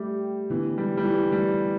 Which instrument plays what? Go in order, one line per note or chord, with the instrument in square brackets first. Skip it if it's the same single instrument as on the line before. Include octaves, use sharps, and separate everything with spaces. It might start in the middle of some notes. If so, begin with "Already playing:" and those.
Already playing: [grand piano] G3 [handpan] A3 G4
[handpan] D3 B3 D4 [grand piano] E3
[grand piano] G3
G3
E3
[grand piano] G3 [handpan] A3 G4